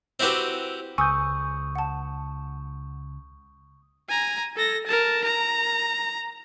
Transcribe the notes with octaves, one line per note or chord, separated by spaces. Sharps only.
C4 E4 F#4 G4 B4
C#2 G#5 C#6 D#6 E6 G6
F#5 A5
G#5 A#5
A4 A#6
A#4 A5
A#5